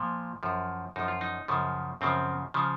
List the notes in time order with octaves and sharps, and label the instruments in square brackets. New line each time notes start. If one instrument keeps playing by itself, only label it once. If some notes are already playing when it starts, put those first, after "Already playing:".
Already playing: [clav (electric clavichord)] A#2 F3
F#2 F3
F#2 F3 D#4
F4
D#4
F#2 C#3 F3
F#2 C#3 F3 C4
C#3 F3